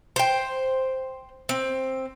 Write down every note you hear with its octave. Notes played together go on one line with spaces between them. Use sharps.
C5 G5
C4